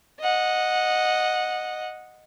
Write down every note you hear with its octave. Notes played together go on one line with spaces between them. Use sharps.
D#5 F#5